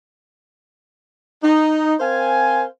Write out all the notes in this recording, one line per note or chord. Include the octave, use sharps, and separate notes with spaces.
D#4
C4 A#4 C5 F5 G#5